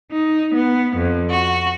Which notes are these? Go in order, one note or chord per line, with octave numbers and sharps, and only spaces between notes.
D#4
B3
F2
F#4